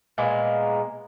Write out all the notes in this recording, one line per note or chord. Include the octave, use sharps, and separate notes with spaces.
A#2 G#3 A#3 B3